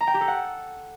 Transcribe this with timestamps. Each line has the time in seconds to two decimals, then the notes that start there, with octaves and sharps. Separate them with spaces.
0.01 A#5
0.07 G5
0.14 G4
0.21 A4
0.28 F#5